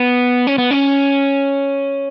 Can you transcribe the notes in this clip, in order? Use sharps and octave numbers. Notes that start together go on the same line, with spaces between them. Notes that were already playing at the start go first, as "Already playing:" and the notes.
Already playing: B3
C#4
B3
C#4